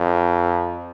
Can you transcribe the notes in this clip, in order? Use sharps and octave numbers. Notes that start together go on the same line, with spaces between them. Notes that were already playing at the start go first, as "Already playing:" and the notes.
Already playing: F2